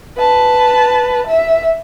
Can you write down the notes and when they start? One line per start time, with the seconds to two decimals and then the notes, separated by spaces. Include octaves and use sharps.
0.17 B4 A5
1.27 E5